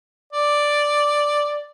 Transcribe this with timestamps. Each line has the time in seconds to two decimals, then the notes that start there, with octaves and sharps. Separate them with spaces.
0.33 D5